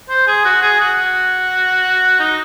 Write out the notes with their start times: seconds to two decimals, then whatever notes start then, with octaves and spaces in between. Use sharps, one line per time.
0.09 C5
0.27 G#4
0.45 F#4
0.62 G#4
0.81 F#4
2.20 D#4